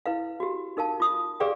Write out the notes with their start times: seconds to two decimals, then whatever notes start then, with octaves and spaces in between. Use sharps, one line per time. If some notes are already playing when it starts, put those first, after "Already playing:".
0.06 E4 B4 F5
0.40 F#4 G4
0.77 D#4 A#4 F5 A5
1.00 F4 D#6
1.40 G4 G#4 B4 D5 F5 G5